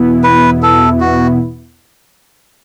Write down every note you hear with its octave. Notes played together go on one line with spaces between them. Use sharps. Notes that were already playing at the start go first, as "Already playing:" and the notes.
Already playing: E2 B2 B3 E4
B4
A4
F#4